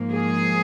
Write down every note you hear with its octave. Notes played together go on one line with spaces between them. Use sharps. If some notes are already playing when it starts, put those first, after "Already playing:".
Already playing: G#2 F3 A#3
G#4